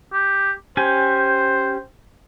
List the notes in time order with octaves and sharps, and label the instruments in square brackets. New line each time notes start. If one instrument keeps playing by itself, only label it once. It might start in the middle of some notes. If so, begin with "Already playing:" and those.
[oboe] G4
[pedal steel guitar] C#4 G4 G#5 [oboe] C5